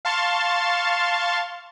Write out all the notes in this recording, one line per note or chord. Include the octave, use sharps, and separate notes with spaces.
F5 A5 C6 C#6 A6